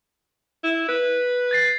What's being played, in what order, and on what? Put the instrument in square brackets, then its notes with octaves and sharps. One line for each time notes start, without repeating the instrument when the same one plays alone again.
[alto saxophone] E4
B4
[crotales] G#6 A6 C7